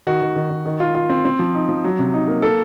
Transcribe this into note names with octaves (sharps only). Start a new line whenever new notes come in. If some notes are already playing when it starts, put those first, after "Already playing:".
D#3 F#4
D#3
D#3
D#3
D#3
F4
F4
C4
C4
F3
D#4
F3
F#3
C3
D#4
A#3
A#3 A4